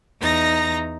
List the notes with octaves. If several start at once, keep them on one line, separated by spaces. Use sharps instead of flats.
E2 D#4 A#5 A#6